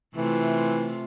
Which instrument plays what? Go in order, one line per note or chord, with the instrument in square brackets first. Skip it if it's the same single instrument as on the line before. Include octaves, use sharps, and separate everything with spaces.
[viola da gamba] C3 A3 F4 [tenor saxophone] E3